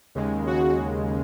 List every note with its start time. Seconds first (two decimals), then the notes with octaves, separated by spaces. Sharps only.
0.15 D#2 C#3 G#3
0.47 F#4